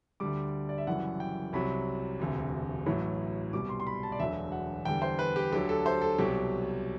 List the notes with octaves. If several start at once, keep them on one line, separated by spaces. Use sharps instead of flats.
D2 D3 G3 D6
D5
E5
F#1 F#2 E3 G3 F#5
G5
C2 C3 F#3 B5
E1 D2 C3
A1 A2 F#3
C2 B2 G3 D6
C6
C6
B5
A5
D5
E1 D2 D3 F#3 E5
F#5
E2 D3 G3 G5
C5
B4
G4
D2 D3 F#3 G4
A4
C5
A4
C2 B2 F#3 G4